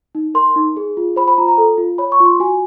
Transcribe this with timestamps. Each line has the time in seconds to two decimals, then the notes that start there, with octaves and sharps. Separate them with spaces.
0.15 D#4
0.34 A#4 C6
0.56 D#4
0.77 G#4
0.97 F4
1.16 C5 B5
1.28 B5
1.38 F4 A#5
1.48 A#5
1.58 A4
1.78 F4
1.98 C#5 B5
2.12 C#6
2.20 F4
2.26 C6
2.40 F#4 G#5